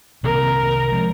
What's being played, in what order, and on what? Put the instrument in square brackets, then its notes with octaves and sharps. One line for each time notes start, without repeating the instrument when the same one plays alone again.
[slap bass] C2 C3 D#3 A#3 [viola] A#4
[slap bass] F3 G#3